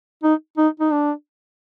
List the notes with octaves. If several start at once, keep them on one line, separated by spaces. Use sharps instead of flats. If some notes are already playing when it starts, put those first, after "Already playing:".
D#4
D#4
D#4
D4